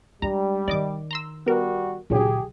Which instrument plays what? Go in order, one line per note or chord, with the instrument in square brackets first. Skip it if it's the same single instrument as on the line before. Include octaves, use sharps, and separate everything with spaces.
[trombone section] G3 [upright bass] G#3 D4 [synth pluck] A#5
[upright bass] D#3 D#4 [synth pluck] D5 D#5 D6
[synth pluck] A#5 C6 E6
[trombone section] G3 F#4 [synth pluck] B3 A#4
[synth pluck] C#2 D3 F#3 [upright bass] A#2 D#3 [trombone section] G4 G#4